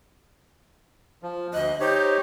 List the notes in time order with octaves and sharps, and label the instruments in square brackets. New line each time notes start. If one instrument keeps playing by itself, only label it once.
[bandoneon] F3
[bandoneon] D2 F#6 [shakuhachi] D#5
[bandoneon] D#4 G4 C#5 [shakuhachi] C5